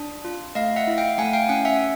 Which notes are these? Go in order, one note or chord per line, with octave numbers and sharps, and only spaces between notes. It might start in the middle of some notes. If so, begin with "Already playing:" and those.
Already playing: D4
F4
A3 D#5 F5
E5 F#5
E4
F5 G5
A3 F#5 G#5
F5 G5
C#4 F#5 G#5
E5 F#5